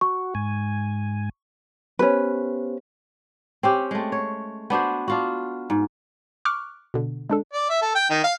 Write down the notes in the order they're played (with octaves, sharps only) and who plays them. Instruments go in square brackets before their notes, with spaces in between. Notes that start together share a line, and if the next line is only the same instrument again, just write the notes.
[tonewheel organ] F#4 [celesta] C#6
[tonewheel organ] G#2 G#5
[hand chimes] B3 G4 C5 [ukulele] C#4 B4
[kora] C4 C#4 G4
G#3 A3
C#5
B3 D4 F#4 C5
D4 F4 F#4
G#2
[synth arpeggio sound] C#6 D6 F6 F#6
B2 D3
G#3 D4 A4
[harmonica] D5
E5
A4
G5
D#3
F5